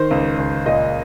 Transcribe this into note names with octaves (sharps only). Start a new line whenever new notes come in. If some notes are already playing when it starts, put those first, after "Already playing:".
Already playing: D#3 C5
C#2
C#2
A#2 D#5